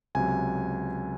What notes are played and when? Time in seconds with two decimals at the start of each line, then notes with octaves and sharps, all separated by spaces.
0.15 C#2 C3 F#3 G#5